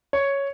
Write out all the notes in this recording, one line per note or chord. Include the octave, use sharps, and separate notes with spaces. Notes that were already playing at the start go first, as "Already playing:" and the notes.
C#5